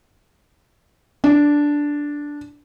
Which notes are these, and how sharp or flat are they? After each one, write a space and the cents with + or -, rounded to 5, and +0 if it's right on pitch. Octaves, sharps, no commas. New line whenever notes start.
D4 -5